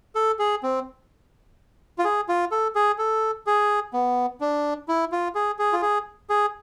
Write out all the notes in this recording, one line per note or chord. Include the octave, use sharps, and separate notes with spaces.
A4
G#4
C4
F4
G#4
F4
A4
G#4
A4
G#4
B3
D4
E4
F4
G#4
G#4
F4
G#4
G#4